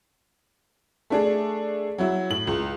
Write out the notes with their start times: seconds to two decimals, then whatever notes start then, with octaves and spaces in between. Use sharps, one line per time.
1.10 A3 D4 G#4
1.98 F#3 E4
2.30 A2 F#7
2.47 C#2